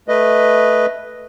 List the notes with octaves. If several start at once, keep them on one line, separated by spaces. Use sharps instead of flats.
A3 B4 D#5